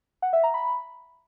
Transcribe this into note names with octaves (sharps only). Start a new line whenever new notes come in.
F#5
E5
A#5
B5